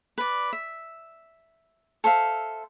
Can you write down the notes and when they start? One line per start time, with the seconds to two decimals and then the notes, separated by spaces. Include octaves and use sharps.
0.18 B4 D5
0.53 E5
2.04 A4 C5 E5 F5